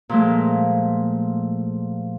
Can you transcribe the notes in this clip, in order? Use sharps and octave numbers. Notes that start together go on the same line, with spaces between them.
A#2 F3 G#3 A3